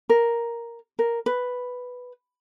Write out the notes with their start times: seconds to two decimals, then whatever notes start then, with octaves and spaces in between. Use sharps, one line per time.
0.09 A#4
0.99 A#4
1.26 B4